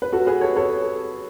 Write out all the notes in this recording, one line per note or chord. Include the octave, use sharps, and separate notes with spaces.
B4
F#4 A4
G#4 B4
A4 C#5
A4 C#5